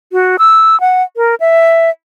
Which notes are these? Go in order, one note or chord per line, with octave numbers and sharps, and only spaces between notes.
F#4
E6
F#5
A#4
E5